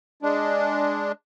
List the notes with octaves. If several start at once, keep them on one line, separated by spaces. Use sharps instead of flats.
G#3 D4